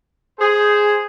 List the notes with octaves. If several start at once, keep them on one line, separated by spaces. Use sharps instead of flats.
G#4 C5